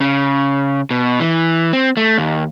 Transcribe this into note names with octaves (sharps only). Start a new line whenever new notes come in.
C#3
B2
E3
C4
A3
D#2